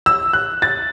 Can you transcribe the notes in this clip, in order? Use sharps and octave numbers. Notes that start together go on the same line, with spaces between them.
E6
F#6
A6